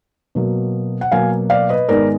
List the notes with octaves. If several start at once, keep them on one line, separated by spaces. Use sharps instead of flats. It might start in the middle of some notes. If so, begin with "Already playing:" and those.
B2 F#3 A#3
F#5
B2 F#3 A#3 F5 G#5
D5 F5
B4 D#5
G#2 D#3 G#3 B3 A#4 D5